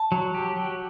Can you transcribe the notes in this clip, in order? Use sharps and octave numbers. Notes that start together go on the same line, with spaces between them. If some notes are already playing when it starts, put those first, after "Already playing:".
Already playing: A5
F#3
G4
F#3